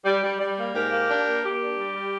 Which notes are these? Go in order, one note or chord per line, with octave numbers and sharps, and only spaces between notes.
G3
G3
G3
A#3
G#2 G4 A#4
A#3
D4
A#3
A#3 G4
D4
G3
G3